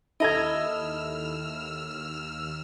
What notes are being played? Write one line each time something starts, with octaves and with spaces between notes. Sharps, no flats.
D#2 E4 A4 D#5 A#5 E6 F6 G#6